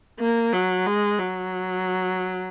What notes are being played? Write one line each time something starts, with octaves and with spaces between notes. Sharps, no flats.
A#3
F#3
G#3
F#3